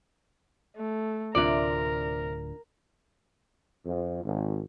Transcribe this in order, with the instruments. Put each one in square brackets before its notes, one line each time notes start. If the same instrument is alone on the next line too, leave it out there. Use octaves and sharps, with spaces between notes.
[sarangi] A3
[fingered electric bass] D1 D2 [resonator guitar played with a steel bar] C3 D5 [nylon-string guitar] D4 F4 [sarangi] A#4
[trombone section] F2
G#1